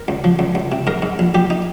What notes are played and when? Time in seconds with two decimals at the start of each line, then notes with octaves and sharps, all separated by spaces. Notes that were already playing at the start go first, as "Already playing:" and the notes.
Already playing: A#4
0.08 C#2
0.24 F3
0.39 C#2
0.55 C#2
0.72 C3
0.87 G#2 A#4
1.02 G#2
1.19 A#1
1.34 A#1 G4
1.50 D#4